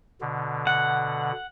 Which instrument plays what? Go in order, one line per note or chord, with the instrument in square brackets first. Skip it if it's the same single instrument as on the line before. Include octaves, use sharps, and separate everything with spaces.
[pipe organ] B2 D3
[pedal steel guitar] F#5